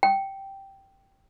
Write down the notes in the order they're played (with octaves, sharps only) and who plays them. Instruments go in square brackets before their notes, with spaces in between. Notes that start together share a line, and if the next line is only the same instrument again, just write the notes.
[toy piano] G5